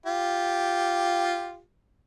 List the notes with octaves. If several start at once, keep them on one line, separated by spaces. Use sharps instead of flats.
F4 G4